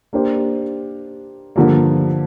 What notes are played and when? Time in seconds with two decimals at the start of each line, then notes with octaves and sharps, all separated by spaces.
0.13 A#3 D4 G4 C5
1.56 G2 D3 F3 A#3